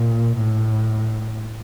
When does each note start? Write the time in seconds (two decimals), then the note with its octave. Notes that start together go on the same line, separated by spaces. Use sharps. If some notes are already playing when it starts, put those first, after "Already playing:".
Already playing: A#2
0.38 A2